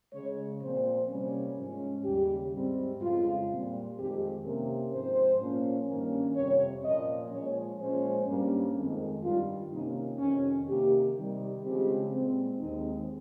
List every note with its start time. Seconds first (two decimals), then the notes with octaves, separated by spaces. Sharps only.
0.12 C#3 G#3 C#4 C#5
0.61 A#2 F3 C4 C5
1.08 C3 G3 A#3 C#4
1.56 G#2 F3 G#3 C#4
2.04 D#2 C#3 G3 G4
2.53 G#2 G3 C4
3.00 F2 C#3 G#3 F4
3.48 A#2 G3 C4
3.96 F2 D#3 G#3 C4 G4
4.44 C3 D#3 A#3 C#4 A#4
4.92 G#2 F3 C4 C5
5.39 A#2 F3 A#3 C#4
5.88 G2 D#3 A#3 C#4
6.36 F2 C3 G3 C4 C#5
6.83 A#2 F3 A#3 C#4 D#5
7.31 A#2 F3 G#3 C#4 C#5
7.79 A#2 F3 G#3 C#4 C5
8.27 G2 G3 A#3 C#4
8.75 F2 D#3 G#3 C4
9.22 G2 D#3 G3 F4
9.71 C3 D#3 A#3 C#4 D#4
10.19 F2 C3 D#3 C#4
10.67 C3 D#3 A#3 G4
11.15 C3 D#3 G3
11.62 C#3 F3 G#3 C4 G4
12.11 A#2 G#3 C4
12.58 D#2 D#3 G#3 C4 D#4